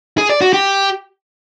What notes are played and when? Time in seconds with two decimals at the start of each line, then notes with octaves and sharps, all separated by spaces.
0.18 G#4
0.30 D5
0.41 F#4
0.53 G4